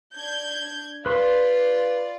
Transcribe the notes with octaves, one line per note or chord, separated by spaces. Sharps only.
D4 G6 G#6
F4 B4 D5 C6